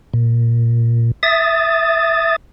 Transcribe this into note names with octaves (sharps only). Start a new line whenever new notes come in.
A#2
E5 D#6 A6